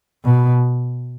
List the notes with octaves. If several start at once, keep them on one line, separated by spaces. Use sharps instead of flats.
B2